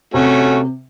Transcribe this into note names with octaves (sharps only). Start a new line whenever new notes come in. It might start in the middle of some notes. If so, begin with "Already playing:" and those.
C3 A3 C#4 F#4